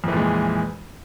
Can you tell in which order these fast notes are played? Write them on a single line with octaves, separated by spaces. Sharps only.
F2 E3 A#2 G#3